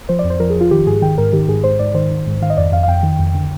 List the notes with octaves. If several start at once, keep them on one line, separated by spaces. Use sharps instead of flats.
F3 C5
D5
F2
C5
F3 A#4
G#4
F3
F4
D#3 G4
G#2 G#4
D#3 G5
G#2 A#4
D#3 G4
G#2 G#4
G#2 C5
G#2 D5
D#3 C5
D#3
G#2
D#3 F5
D#5
F2 D5
F2 F5
F5
F2 G5
D#3
F2
D3